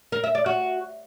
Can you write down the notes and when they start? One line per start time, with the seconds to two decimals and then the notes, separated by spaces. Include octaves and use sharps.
0.12 A#4
0.24 E5
0.35 D5
0.46 F#4